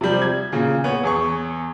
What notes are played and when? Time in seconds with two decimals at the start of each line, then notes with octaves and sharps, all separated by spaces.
0.01 C3 F3 G3
0.22 G#6
0.52 A#2 C#3
0.84 B3 C#5
1.04 E2 G#4 C#6